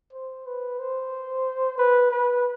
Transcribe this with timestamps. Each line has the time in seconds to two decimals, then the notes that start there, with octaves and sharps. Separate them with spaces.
0.13 C5
0.46 B4
0.79 C5
1.78 B4
2.11 B4